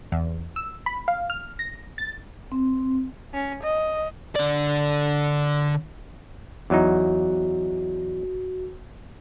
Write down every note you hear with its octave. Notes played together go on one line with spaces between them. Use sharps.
E2
E6
B5
F5
F6
A#6
A6
C4
C#4
D#5
D3 D5
E2 F#3 D#4 F#4